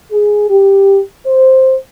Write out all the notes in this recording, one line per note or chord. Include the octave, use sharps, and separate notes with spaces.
G#4
G4
C5